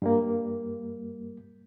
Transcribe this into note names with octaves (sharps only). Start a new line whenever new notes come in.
G2 G3 A#3